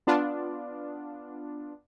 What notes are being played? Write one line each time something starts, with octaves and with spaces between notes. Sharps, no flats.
B3 D4 F4